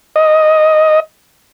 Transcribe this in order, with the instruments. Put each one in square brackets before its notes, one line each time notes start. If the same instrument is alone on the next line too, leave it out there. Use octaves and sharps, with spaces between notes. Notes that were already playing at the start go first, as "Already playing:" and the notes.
[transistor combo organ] D#5